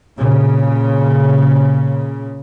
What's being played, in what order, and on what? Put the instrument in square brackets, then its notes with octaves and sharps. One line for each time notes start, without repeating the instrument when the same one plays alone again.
[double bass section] A#2 C#3